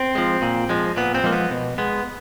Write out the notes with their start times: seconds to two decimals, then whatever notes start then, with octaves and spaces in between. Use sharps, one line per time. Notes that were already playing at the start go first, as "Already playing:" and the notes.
Already playing: C4
0.15 F3 G#3
0.42 A#2
0.70 F3 G#3
0.97 A#2 B3
1.15 C4
1.24 F3 G#3 A#3
1.32 B3
1.51 B2
1.78 G#3 B3